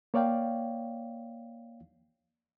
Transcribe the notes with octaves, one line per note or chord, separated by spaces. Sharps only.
A#3 C#5 D5 F5 G5